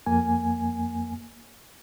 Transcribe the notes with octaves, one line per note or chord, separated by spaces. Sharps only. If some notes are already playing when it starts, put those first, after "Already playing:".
F2 A#3 G#5